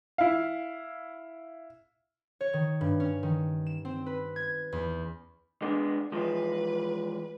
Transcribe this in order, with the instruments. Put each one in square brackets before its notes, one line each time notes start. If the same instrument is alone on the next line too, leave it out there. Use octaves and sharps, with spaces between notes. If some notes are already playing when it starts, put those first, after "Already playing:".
[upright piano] E4 F5
[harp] C#5
D#3
G2
C#4
D#3
E7
C4
B4
G#6
E2
[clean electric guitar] G#3 B3 D4
[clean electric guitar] E3 F3 G#3 [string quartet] B4